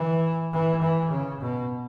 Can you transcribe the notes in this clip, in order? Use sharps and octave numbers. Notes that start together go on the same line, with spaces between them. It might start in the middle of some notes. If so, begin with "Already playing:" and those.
Already playing: E3
E3
E3
C#3
B2